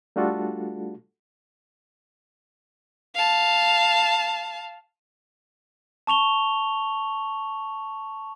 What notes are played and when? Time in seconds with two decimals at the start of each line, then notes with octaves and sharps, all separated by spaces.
0.16 G3 A3 D4 F4 F#4 A4
3.15 F5 A5
6.07 A5 C#6 F7 G7